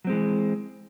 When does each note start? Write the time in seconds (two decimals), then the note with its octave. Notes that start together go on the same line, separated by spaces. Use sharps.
0.05 F#3
0.07 C4
0.10 G#3
0.12 E3